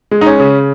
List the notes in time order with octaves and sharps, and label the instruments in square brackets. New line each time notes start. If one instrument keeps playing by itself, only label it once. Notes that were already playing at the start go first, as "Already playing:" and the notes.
[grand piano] G#3
D#4
C#4
C#3